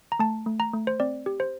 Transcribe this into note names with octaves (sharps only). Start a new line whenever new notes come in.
A#5
A3 A5
A3
A#5
A3
C5
C4 D5
G4
C5